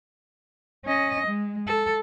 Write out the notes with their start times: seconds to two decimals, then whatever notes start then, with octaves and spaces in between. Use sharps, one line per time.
0.85 C#4 D#5
1.27 G#3
1.68 A4